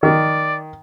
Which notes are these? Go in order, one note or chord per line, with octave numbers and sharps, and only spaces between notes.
D#3 D5